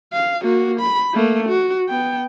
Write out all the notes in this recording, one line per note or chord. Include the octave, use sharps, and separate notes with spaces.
F5
A#3 F#4
B5
A3 A#3
F#4
B3 G5